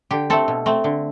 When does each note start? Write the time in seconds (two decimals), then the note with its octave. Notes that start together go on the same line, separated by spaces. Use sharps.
0.11 D3 G4
0.30 A3 C4 A4
0.48 B2
0.66 A3 C4
0.84 D3